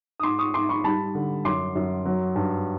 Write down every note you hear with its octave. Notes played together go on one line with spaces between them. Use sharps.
D#6
G#2 C6 D6
C#6 D#6
G#2 C6 D6
B5 C#6
G3 A5 B5
D3
F#2 C6 D6
F#2
F#3
G2